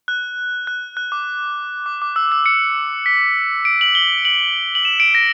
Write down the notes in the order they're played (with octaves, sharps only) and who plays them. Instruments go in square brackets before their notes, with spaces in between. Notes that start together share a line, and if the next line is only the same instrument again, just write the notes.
[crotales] F#6
F#6
F#6
D6
D6
D6
E6
E6
C#7
B6
D7
F#7
G7
F#7
F#7
E7
D7
A#6